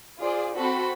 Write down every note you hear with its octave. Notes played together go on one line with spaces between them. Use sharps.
F4 G#4 C5 D5
C4 F#4 A4 B5